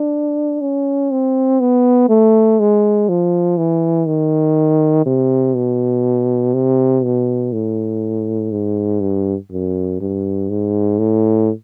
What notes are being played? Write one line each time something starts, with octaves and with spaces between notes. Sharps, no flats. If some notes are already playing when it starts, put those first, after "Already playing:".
Already playing: D4
C#4
C4
B3
A3
G#3
F3
E3
D#3
C3
B2
C3
B2
A2
G#2
G2
F#2
G2
G#2
A2